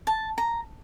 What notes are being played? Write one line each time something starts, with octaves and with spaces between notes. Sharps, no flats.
A5
A#5